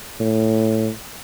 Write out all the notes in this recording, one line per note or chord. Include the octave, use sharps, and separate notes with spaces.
A2